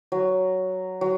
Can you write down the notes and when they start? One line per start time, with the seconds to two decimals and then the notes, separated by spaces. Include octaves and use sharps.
0.12 F#3
1.01 F#3